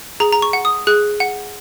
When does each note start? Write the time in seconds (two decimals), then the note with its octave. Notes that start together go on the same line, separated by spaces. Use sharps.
0.20 G#4 A#5
0.32 A#5
0.42 C#6
0.53 F#5
0.65 D#6
0.87 G#4 F#6
1.20 F#5